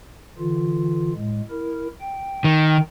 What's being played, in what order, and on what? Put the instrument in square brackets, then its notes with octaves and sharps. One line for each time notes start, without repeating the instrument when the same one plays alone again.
[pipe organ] D3 E3 F4
A2 G#3
E4 A#4
G5
[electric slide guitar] D#3